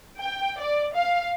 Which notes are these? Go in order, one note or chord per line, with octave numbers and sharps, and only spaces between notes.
G5
D5
F5